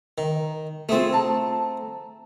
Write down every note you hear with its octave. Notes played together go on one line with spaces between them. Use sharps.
D#3
A3 C4 F4 G#4
A5 A#5